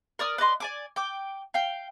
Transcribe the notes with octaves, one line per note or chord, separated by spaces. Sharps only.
A#4 D5 D#6 F6
B4 D5 D#5 C6
D5 G#5 D6
G5 D6
F5 G5